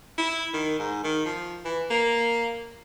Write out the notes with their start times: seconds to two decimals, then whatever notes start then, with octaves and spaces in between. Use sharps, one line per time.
0.18 E4
0.54 D#3
0.79 G#2
1.04 D#3
1.26 F3
1.65 E3
1.91 A#3